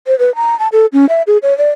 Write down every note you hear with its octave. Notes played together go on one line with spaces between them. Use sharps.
C5
B4
A#5
A5
A4
C#4
E5
G#4
C#5
D5